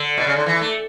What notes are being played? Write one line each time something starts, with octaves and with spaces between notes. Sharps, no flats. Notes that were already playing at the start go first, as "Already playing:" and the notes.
Already playing: D3
B2
C#3
D3
E3
A3